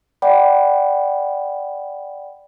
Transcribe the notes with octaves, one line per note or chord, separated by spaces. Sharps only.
D5 F#5 G5 B5